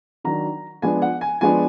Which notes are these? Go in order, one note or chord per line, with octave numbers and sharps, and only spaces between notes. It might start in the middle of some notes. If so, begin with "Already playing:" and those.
D#3 F#3 D4 A#5
F3 G#3 B3 D4 G#5
F#5
G#5
F3 G#3 B3 D4 G#5